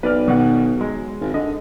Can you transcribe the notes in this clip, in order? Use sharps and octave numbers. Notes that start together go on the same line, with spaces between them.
B1 B4 D5 F6
B2 D#3 F#5
F#3 G#3
G#1
D3 D#5